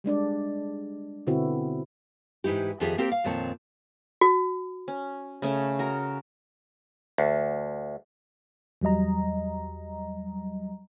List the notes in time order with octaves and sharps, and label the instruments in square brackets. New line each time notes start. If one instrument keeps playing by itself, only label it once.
[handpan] G3 G#3 D4 D5
B2 D3 B3 C4 E4 F#4
[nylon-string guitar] G#2 E3 D#4 E4 G4
F2 D#3 F3 G4 G#4 E5
A#3 C4 G4 A#4 C5 G5
F5
F2 A#2 D#3 C4 C#5 A5
[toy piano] F#4
[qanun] C#4
C#3 A3 C#4
F#4 A#4
[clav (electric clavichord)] D2
[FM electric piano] E2 F#3 G3 D#5 A#5